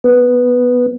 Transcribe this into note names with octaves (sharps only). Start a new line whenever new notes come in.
B3